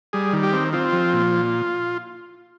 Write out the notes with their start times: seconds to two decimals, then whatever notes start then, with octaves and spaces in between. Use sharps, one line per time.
0.13 G3 G#4
0.33 D#3
0.43 G4
0.53 C4
0.73 C4 F4
0.92 F3
1.13 A#2